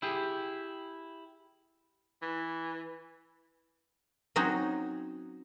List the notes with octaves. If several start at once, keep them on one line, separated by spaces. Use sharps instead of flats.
E4 G4 G#4
E3
F#3 C4 C#4 D#4 F#4